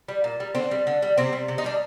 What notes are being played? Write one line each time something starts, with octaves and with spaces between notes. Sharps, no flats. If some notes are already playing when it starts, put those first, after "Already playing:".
G3
A#2
G3
D3 C4
G3
D3
G3
C3 C4
G3
C3
D#4
G3 D4